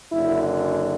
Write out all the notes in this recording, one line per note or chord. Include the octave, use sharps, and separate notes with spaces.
F#1 F#2 D3 E4